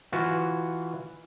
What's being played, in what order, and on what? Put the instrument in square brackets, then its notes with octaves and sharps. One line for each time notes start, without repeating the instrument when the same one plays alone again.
[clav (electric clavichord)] E3 F4 F#4